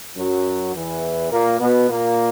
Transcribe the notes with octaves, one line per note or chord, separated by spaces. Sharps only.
F#2 F#3
E2 E3
A#2 A#3
B2 B3
A#2 A#3